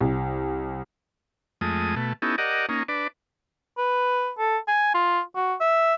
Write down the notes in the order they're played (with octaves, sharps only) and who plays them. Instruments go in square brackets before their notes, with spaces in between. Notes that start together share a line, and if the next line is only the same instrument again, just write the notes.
[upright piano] C2
[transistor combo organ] F2 G#3 A3 D#6
B2 A3
B3 C#4 D#4 E4 G4 A4
G4 A#4 D5 D#5 F#5
A#3 C#4 D#4
D4 B4 D5
[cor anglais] B4
A4
G#5
F4
F#4
E5